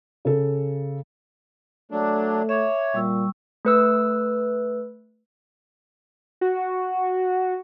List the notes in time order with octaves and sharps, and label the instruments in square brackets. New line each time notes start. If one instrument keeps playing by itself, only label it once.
[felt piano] C#3 A4
[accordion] F#3 D4 [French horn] A3
[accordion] C#5 [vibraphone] E5 D6
[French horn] A#2 [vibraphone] G3 C#6 E6
[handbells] A3 B4 E6
[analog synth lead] F#4